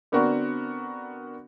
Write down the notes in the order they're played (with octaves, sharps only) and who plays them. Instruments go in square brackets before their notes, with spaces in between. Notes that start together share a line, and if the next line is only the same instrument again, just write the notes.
[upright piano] D3 B3 C4 D4 F#4 A#4